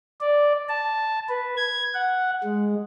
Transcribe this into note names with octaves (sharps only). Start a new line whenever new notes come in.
D5
A5
B4
G#6
F#5
G#3